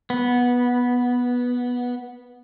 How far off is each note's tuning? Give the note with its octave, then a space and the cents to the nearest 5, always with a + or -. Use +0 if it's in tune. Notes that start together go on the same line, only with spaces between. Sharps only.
B3 -10